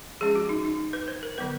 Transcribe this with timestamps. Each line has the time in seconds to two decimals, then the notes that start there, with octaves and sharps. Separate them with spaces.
0.21 F3 G#3 C#4 G#4
0.36 F#4
0.49 D#4
0.65 D#4
0.93 B4
1.08 C5
1.23 A#4
1.38 D3 F#3 B3 B4